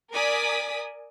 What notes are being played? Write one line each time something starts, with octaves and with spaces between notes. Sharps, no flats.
A#4 D5 G#5 D#6 B6